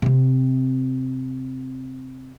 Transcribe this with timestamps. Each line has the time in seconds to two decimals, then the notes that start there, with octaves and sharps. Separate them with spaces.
0.02 C3 C4